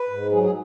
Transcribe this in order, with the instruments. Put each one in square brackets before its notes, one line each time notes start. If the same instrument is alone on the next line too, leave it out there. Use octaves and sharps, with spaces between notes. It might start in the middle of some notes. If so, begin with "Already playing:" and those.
Already playing: [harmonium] B4
G#2
F#3 G#4
G#4